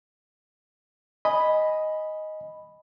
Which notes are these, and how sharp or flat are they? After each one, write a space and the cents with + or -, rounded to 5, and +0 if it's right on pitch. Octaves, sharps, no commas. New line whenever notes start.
D#5 +0 G#5 +0 B5 +0